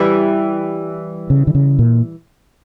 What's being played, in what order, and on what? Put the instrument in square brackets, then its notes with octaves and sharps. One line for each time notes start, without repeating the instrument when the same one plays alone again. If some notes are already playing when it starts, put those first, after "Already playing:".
Already playing: [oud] E3 G3
[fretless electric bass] C#3
D3
C#3
A#2